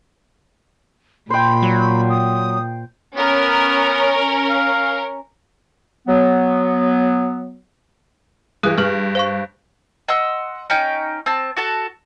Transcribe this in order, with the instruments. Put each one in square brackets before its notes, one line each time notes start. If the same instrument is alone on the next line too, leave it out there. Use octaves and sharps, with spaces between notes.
[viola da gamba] A#2 [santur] C5 G5 [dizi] B5
[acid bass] F#3
[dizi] D#6
[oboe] B3 [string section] C#4 A#4
[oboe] F5
[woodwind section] F#3 B3
[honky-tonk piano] G2 E3 [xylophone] G#4 D#6 F#6
[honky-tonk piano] G2 [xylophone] B4 C#6 F6
[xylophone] C5 F5 C#6
[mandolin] D#5 F#5 C6 E6
C#4 D#4 G5
C4 A5
F#4 A4 A5